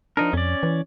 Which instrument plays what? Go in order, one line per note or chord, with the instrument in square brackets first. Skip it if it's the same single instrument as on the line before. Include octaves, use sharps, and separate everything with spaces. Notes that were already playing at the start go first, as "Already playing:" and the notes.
[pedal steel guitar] F3 D#4 A#4 [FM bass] D4
[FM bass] F2 [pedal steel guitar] C#4 D5
[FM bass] E3